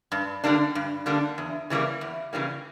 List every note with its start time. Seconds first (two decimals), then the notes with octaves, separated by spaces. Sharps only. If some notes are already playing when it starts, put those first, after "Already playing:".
0.12 G2
0.44 D3 G3 A#3 D4
0.75 G2
1.06 D3 G3 A#3 D4
1.38 E2
1.70 C#3 E3 G3 A#3
2.01 E2
2.33 C#3 E3 G3 A#3